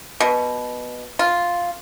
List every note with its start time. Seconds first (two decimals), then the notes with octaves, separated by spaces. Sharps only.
0.20 B2
1.19 F4